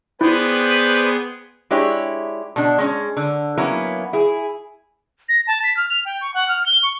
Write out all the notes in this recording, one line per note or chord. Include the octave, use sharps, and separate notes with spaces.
B3 E4 G#4 B4 C5 D5 G5 G6
G#3 D4 E4 G4 C#5
B2 D4
G#3 C#4
D3
F#3 A#3 B3 C#4 E4
E4 G#4
A#6
A5
B6
F6
F7
G5
C#6
F#5
F6
G7
C#6